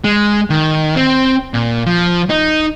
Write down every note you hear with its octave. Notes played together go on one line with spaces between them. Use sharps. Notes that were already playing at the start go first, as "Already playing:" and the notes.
G#3
D#3
C4
A#2
F3
D#4